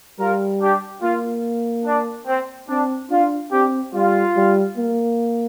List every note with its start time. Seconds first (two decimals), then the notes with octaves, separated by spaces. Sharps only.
0.19 G3 F4 A#4
0.62 D4 G4
1.02 A#3 F4
1.86 D4
2.28 C4
2.69 C4 D4
3.10 D4 F4
3.52 C4 D4 G4
3.94 G3 F4
4.36 G3
4.77 A#3